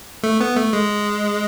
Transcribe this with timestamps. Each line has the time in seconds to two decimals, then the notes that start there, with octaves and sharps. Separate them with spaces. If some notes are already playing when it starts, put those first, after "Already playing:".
0.23 A3
0.41 B3
0.56 A3
0.73 G#3